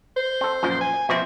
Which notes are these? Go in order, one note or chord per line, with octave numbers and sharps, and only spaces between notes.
C5
C4 A4
F#2 A#2 F3
G#5
B2 F3 C4 E5